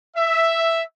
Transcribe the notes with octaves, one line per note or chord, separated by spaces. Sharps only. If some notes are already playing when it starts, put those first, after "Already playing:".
E5